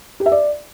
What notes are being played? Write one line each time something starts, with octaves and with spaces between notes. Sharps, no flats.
G4
E5
D5